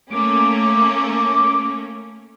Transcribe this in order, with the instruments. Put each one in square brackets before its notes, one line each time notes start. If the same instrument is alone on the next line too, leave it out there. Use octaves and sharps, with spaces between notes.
[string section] A3 A#3 C#4 [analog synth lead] D6